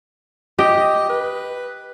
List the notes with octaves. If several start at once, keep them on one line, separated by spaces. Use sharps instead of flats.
G4 D#5 G5
B4